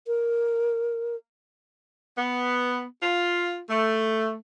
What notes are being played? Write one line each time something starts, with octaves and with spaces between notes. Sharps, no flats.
A#4
B3
F4
A3